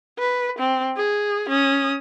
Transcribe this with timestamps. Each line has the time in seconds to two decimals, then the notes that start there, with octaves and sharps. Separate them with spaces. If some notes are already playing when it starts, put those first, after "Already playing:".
0.19 B4
0.59 C4
0.97 G#4
1.49 C#4 D#6